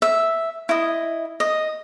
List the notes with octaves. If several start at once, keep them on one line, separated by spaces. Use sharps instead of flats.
E5
E4 D#5
D#5